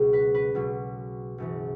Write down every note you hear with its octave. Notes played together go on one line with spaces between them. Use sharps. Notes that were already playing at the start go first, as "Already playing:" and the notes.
Already playing: C#2 B2 F#3 G#4
B4
B4
B1 B2 F#3
F#1 F#2 E3